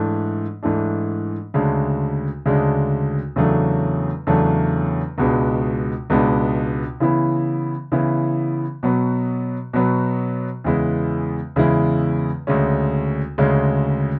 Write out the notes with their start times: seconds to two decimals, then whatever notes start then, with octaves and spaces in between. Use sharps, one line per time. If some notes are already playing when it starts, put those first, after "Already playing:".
Already playing: G#2 E3 A3 D4
0.63 G#2 E3 A3 D4
1.54 D2 C#3 G#3 D4
2.46 D2 C#3 G#3 D4
3.36 E2 C#3 F#3 A3 D4
4.27 E2 C#3 F#3 A3 D4
5.18 C#2 B2 G#3 B3 D4
6.10 C#2 B2 G#3 B3 D4
7.00 C#3 E3 B3 E4
7.92 C#3 E3 B3 E4
8.83 B2 F#3 B3
9.73 B2 F#3 B3
10.64 E2 C#3 G#3 B3 E4
11.56 E2 C#3 G#3 B3 E4
12.47 D2 C#3 G#3 C#4
13.38 D2 C#3 G#3 C#4